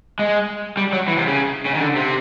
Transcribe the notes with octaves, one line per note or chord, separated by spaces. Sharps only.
G#3
G3
F#3
E3
C3
C#3
C#3
D#3
D3
C3